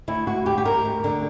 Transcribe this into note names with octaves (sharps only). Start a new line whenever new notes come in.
D2 E4
D2 F#4
D2 G4
G4
D2 A#4
D2
D3